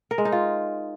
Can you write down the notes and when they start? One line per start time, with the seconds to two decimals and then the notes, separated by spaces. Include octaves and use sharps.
0.11 A#4
0.18 G#3
0.25 D#4
0.32 F4